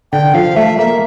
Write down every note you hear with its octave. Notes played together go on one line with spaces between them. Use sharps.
D3 G5
F3 F5
A3 E5
A#3 E5